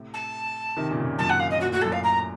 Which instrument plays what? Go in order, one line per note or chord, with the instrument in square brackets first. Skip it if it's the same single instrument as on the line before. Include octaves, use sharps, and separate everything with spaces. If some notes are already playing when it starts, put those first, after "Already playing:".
Already playing: [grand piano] A2 C3
[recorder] A5
[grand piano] C3 D#3
A#2 C#3
A#2 C#3
[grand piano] F#2 A#2 [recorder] A5
[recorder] F#5
F5
D#5
[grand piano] A#2 [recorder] F#4
[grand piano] A2 [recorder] F#4
[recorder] A4
[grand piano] F#2 A#2
[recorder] F5
A#5